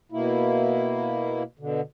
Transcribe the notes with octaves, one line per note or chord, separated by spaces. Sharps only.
B2 A#3 E4
B2 D3